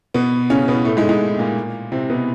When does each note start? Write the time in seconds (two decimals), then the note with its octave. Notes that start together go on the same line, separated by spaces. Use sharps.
0.14 B2 B3
0.50 C#3 C#4
0.68 B2 B3
0.85 A2 A3
0.97 G#2 G#3
1.09 G#2 G#3
1.38 A#2 A#3
1.92 C3 C4
2.10 B2 B3